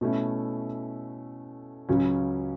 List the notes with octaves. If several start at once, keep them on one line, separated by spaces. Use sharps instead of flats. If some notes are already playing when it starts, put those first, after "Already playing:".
B2 A3 C#4 E4
C#2 C#3 F#3 C#4